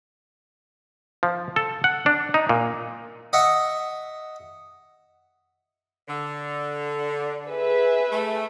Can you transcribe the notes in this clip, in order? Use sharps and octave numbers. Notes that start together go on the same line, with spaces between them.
F3
A4
F#5
D4
D#4
A#2
D#5 E5 F#5 C#6
D3
G#4 B4 E5
A3